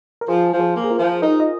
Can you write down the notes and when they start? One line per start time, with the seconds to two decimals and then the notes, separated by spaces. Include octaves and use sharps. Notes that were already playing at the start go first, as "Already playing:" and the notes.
0.21 A#4
0.28 F3 G#4 C5
0.52 F3
0.60 G#4 C5
0.75 A#3
0.84 G#4
0.90 F4 A#4
0.99 F3
1.22 D#4 A#4 D#5
1.40 D#5